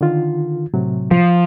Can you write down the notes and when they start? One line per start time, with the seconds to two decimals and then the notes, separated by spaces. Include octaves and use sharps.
0.01 D3 D#3 F4
0.74 A2 C3 F#3
1.11 F3